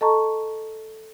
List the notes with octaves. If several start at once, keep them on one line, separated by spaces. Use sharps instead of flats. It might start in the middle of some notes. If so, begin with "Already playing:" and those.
A4 D#5 A5 A#5 C#6